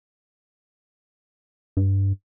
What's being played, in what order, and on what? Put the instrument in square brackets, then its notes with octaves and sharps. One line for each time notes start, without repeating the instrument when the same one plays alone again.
[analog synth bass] G2